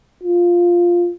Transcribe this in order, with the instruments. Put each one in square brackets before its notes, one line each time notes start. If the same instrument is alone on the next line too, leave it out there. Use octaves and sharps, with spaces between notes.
[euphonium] F4